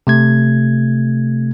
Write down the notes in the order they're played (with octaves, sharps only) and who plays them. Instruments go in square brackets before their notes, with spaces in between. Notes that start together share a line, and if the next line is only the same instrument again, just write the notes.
[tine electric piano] C3 A3 G#6